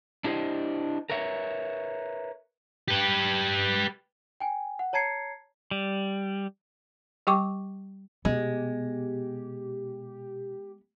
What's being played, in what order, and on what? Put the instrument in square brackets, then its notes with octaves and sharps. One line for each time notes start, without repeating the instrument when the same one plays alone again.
[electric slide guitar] D4 E4 G4 A#4 C5 D#5
A#4 B4 C#5 E5
[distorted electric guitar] G4 B4
[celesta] G5 G#5
F#5
C#5 A5 A#5 G#6 C7 C#7
[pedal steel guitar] G3
[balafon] G3 G4 G5 C#6 D6
[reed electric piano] B2 [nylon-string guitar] G#3 [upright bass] B3 [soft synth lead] G4